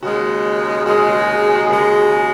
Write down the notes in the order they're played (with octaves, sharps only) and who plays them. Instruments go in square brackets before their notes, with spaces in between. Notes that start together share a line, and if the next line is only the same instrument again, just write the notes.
[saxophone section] D#2 C#3 G#3 [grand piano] F#4
[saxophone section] D#2 C#3 G#3 [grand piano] F#4
[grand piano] G#4
F#4
G#4
F#4
G#4
F#4
[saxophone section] D#2 C#3 G#3 [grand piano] G#4
[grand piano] F#4
G#4
F#4
G#4